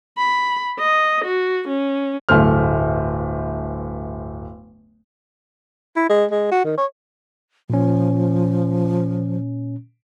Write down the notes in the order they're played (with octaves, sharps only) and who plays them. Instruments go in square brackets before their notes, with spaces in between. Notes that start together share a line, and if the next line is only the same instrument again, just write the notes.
[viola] B5
D#5
F#4
C#4
[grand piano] D1 G1 A3 C5 F6
[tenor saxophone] E4
G#3
G#3
F#4
D#3
C#5
[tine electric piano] A#2 C#4 [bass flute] F3